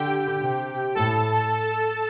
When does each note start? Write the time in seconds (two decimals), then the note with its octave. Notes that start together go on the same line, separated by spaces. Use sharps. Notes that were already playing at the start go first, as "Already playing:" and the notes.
Already playing: D3 G4 G5
0.41 C3
0.95 A2 A4 A5